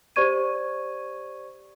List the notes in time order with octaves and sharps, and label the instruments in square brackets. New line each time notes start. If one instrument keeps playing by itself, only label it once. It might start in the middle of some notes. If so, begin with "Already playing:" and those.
[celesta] G4 C5 D5 C#6 G#6 D#7